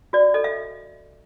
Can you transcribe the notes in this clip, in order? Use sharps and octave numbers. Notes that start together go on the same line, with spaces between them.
F#4 D5
A4 D#5
E5